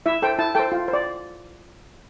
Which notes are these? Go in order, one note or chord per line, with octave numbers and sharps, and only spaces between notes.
E4 E5
A4 C5 G5
E4 A5
A4 C5 G5
F4
C5
D5